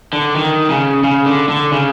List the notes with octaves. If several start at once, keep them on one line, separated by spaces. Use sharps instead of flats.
D3
D#3
C#3
C#3
D3
D3
C#3